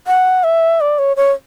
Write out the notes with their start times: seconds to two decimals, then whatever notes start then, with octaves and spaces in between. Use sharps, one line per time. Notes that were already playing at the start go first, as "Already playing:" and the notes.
0.07 F#5
0.44 E5
0.81 D5
0.99 C#5
1.17 C#5